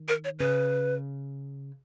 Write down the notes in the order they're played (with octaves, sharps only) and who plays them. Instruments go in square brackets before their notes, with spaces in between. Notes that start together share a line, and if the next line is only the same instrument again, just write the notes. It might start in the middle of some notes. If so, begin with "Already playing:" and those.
Already playing: [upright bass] D#3
[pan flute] A#4
C#5
[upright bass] C#3 [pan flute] B4